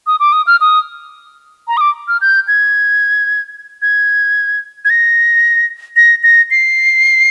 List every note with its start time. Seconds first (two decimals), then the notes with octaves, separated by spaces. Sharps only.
0.07 D#6
0.20 D6
0.33 D#6
0.47 F6
0.61 D#6
1.68 A#5
1.77 D#6
1.81 D6
2.08 F6
2.21 G6
2.48 G#6
3.82 G#6
4.85 G#6
4.90 A#6
5.96 A#6
6.23 A#6
6.51 C7